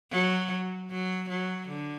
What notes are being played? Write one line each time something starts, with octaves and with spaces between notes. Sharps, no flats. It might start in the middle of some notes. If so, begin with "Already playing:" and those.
F#3
F#3
F#3
D3